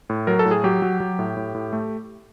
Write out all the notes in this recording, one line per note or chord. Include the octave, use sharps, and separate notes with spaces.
A2
F#3 A#4
A4
A2
G#4
F#3 G4
F#3
F#3
A2
A2
A2
A3